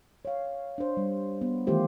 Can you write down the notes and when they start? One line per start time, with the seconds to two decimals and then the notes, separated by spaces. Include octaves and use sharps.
0.25 C#5 F5
0.78 D4 C5
0.97 G3
1.41 B3
1.67 D#3 E3 A3 F4 G4 C5